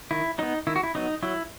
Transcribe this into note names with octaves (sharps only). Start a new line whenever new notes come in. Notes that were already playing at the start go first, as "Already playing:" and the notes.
D#3 E4
F#3 B3 D#4
D#3 E4
F#4
E4
F#3 B3 D#4
F#3 E4